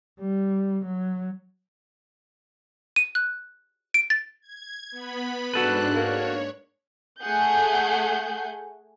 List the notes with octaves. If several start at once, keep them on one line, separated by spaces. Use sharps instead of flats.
G3
F#3
D#7
F#6
D7
A6
G#6
B3 B5
G#2 D4 F#4 A4 B4 F#6
A#3 C#5
A3 G#4 F#5 G#5 G6